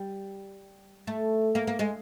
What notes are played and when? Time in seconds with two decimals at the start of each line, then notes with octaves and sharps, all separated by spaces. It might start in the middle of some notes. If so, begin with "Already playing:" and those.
Already playing: G3
1.07 A3
1.55 A#3
1.67 A#3
1.79 G#3